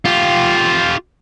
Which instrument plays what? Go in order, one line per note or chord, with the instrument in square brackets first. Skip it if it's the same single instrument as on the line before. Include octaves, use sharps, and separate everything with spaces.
[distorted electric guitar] F4 G4